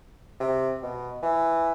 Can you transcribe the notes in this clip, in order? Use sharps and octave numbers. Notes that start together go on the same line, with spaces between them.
C3
B2
E3